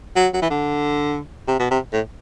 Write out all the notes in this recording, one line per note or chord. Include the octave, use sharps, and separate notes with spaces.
F#3
F#3
E3
D3
C3
B2
C3
A2